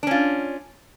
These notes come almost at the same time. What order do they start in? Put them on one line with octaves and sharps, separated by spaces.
D4 C#4 F4